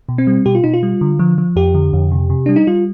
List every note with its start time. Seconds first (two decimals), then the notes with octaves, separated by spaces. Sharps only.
0.09 B2
0.18 C4
0.27 G3
0.46 B2 G4
0.55 F4
0.64 B2 D#4
0.74 F4
0.83 G3
1.01 D3
1.19 F3
1.38 F3
1.56 F2 G4
1.75 D3
1.93 F2
2.11 C3
2.30 C3
2.46 G3 D4
2.56 D#4
2.67 G3 F4